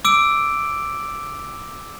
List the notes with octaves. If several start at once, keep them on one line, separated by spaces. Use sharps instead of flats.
D6 E6 D7